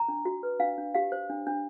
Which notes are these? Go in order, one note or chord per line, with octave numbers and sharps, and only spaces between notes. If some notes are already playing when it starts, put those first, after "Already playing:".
Already playing: A#5
D4
F#4
B4
D4 F5
D4
G4 F5
C5
D4
D4